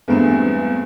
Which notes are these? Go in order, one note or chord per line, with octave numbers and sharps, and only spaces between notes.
E2 G2 G#3 A3 B3 C4